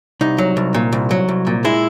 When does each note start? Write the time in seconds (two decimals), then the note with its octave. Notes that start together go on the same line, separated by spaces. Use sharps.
0.21 C2 D#4
0.38 F#3
0.57 C2
0.74 A#2
0.93 C2
1.11 F#3
1.29 C2
1.47 A#2
1.65 G#3 E4